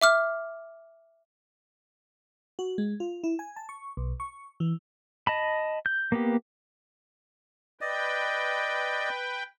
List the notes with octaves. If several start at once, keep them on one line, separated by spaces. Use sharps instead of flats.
E5 D6 F6
F#4
G#3
F4
E4
G#5
A5
C#6
B1
C#6
E3
D#5 A5 B5
G6
A#3 B3 G4
B4 D5 D#5 G5